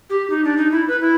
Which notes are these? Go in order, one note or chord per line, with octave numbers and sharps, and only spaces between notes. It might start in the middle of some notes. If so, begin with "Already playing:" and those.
G4
D#4
D4
D#4
E4
B4
E4